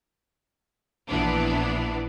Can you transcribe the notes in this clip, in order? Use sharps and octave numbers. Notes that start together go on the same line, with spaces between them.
A#1 E3 B3 D4